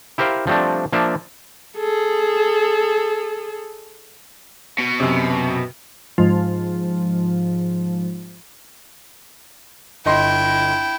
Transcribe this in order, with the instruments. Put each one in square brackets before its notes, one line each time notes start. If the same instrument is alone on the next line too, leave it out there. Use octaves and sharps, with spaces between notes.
[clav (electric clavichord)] E4 G4 A#4 C5 E5 F5
F3 G3 A3 C4 D4
F3 A#3 D4 E5
[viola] G#4 A4
[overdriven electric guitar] B2
[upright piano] F#2 C3
[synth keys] G#2 F3
[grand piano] G1 D#5 C6 [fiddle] E4 G5